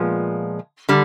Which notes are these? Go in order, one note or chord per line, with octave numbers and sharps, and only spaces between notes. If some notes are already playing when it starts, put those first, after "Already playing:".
Already playing: A#2 F3 G#3 B3
D3 G3